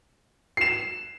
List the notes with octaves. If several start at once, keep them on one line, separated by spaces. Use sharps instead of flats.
C7 E7